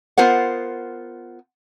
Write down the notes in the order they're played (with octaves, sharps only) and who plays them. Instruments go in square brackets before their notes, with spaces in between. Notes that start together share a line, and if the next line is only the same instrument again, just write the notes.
[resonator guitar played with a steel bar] B3 F4 A#4 C5 F#5